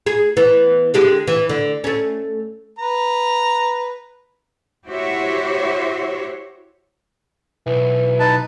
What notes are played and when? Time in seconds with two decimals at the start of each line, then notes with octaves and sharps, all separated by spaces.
0.06 G#4
0.37 E3 B3
0.94 D3 G#3 G4
1.28 E3
1.49 D3
1.84 A3 C#4
2.79 B4 A#5
4.87 E4 F#4 G4 C5 C#5 E5
7.67 B1 E3
8.20 D#4 B4 A5